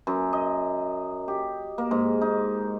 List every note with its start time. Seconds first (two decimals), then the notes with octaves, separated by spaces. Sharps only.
0.07 F#2
0.33 D#5
1.28 G4
1.78 A#3
1.91 G#2
2.21 D#4